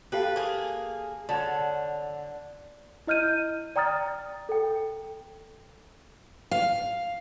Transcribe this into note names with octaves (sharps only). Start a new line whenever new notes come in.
G4 A4 B4 F5
A#3 G#4
D3 C#5 F#5 A5
E4 D#5 F6 G6 D#7
D5 G5 A#5 D#6 F6 A6
A4 G5
F5